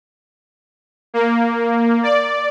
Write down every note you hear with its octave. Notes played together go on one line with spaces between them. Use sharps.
A#3
D5